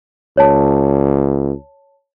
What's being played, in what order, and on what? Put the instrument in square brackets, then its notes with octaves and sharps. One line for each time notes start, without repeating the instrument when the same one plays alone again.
[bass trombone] C#2 [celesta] C#5 A5